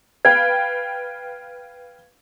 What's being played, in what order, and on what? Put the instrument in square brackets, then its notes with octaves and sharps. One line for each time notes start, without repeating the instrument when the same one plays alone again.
[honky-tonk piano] B4 F5 G5 [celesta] G#6